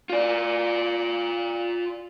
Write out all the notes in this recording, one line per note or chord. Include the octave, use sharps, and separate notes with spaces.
F4 D5